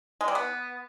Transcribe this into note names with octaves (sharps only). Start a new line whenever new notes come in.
G#3
G3
B3